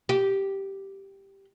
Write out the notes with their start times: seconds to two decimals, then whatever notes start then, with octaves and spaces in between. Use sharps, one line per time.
0.09 G4